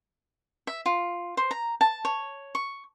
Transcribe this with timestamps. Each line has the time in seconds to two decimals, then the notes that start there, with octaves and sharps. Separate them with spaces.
0.67 E5
0.86 F4
1.37 C5
1.51 A#5
1.81 A5
2.05 C#5
2.55 C#6